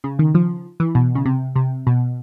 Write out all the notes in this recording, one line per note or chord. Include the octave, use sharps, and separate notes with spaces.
C#3
D#3
F3
E3
B2
C#3
C3
C3
B2